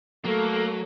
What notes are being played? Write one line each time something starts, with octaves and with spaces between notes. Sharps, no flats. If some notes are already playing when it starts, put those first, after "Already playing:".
F#3 A3 A#3 A4